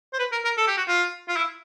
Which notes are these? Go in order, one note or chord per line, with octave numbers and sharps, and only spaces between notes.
C5
B4
A#4
A#4
A4
G4
F#4
F4
F4
E4